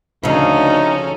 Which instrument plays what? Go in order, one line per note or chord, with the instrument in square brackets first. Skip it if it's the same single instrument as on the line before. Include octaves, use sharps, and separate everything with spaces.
[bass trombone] D2 [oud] C#3 F3 [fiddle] C#4 A4 [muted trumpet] D#4